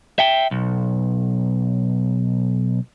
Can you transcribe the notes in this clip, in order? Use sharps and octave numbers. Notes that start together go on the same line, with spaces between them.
E5 G5
B1